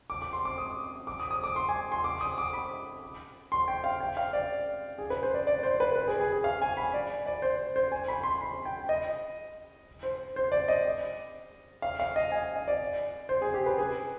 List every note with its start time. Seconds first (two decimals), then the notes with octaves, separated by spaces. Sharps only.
0.10 D6
0.22 D6
0.33 C6
0.45 D6
0.58 D#6
1.07 D6
1.20 D#6
1.31 D#6
1.44 D6
1.56 C6
1.69 G#5
1.92 C6
2.04 D6
2.21 D#6
2.38 D6
2.53 B5
3.52 C6
3.68 G5
3.84 F5
4.01 G5
4.17 F5
4.33 D5
4.98 G#4
5.10 B4
5.23 C5
5.34 D5
5.47 D5
5.63 C5
5.80 B4
5.96 B4
6.07 G#4
6.20 G#4
6.33 G#4
6.44 F5
6.62 G#5
6.77 B5
6.94 D5
7.26 D5
7.42 C5
7.76 C5
7.92 G#5
8.08 B5
8.23 C6
8.41 B5
8.65 G5
8.89 D#5
10.03 C5
10.36 C5
10.52 D5
10.68 D#5
11.82 F5
12.00 F5
12.16 D#5
12.32 G#5
12.56 D#5
12.68 D5
13.29 C5
13.42 G#4
13.54 G4
13.66 B4
13.78 G#4